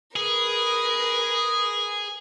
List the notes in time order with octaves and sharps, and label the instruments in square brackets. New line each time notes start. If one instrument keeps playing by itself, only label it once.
[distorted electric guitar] G#4 [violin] A#4 B4